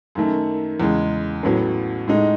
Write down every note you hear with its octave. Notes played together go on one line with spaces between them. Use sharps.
F#2 D#3 A3
E2 C#3 G#3
A1 A2 F#3 B3
A2 G#3 D#4